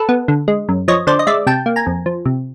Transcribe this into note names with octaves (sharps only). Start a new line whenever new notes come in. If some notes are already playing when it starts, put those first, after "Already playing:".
Already playing: A4 B4
B3
D3
G#3
F#2
F3 C#5 D#5
D3 C5 D5
D#5
G#3 D5 E5
C3 G5 A5
A#3
G#5 A#5
F2
F3
C3